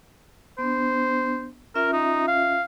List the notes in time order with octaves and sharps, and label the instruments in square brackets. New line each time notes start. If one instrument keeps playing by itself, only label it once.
[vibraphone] B3 D4 [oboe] C5
[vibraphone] C#4 F4 E5 [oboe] A#4
[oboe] D#4
F5